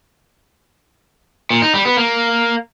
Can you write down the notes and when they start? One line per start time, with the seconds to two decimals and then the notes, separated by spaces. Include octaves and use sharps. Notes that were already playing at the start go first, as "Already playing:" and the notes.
1.51 A#2
1.62 D#4
1.74 G3
1.85 B3
1.97 A#3